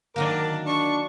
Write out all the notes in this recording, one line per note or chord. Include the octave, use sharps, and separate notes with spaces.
D#3 F#3 A#3 D4 A#4 D6
D4 C#6